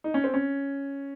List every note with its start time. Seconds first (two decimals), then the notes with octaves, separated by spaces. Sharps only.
0.04 D#4
0.14 C#4
0.24 C4
0.34 C#4